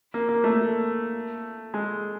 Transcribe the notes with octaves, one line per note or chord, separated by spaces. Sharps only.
A#3
A#3
A3
G#3